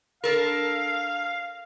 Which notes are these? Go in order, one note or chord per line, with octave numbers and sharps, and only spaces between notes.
D4 A4 A#4 F5